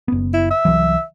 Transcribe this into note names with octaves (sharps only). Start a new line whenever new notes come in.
F#1 B3
E4
E5
C2 E3 F#3